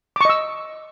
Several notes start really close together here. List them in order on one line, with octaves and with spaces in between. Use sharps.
D6 C#6 D#5 E6